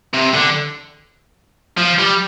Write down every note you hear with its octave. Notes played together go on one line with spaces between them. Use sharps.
C3
D3
F3
G3